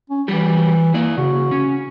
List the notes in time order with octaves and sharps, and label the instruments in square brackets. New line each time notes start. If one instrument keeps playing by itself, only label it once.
[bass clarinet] C#4
[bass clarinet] E3 [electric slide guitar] F#3 G3 G4
[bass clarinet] A#3 [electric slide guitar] E4 D5
[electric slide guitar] C#3 [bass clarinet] F#4
[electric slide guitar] C#4